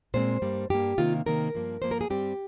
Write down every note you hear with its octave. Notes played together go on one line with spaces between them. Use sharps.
A#2 G#3 C4 C5
G2 G3 A#3
G2 G3 A#3 G4
C3 D#3 A#3 F4
C3 D#3 A#3 A#4
G2 F3 A#3
G2 F3 A#3 C5
A#4
G#4
G2 G3 C4 G4